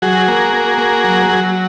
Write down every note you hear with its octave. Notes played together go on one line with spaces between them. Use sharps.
F#3 F#4 G#4
A#3
A#3
A#3
F#3
F#3